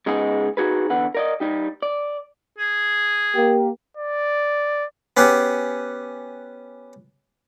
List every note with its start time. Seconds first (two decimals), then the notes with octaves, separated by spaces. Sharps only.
0.06 C#3 G#3 B3 D#4 G#4
0.57 D#4 F#4 G#4 B4
0.90 E2 D3 B4 F#5
1.15 A#4 D5 D#5
1.40 G3 D#4 G4
1.82 D5
2.58 G#4
3.35 A#3 G4
3.97 D5
5.17 B3 C#4 G4 G#4 F#5